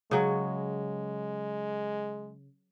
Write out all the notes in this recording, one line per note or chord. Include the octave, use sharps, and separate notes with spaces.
C#3 F#3 G#3